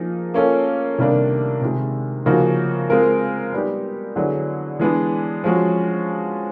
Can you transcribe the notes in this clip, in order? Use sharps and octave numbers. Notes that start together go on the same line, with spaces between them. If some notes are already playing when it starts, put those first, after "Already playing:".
Already playing: F3 A#3 D#4 G#4
A#3 C#4 F4 A4
C3 D#3 G3 A#3 D4
C3 D#3 G#3
C#3 F3 A#3 D#4 F#4
G#3 C4 F4 A#4
G3 B3 D#4 G4
D3 F#3 B3 E4 G#4
E3 G#3 B3 D4
F3 G#3 C#4 F#4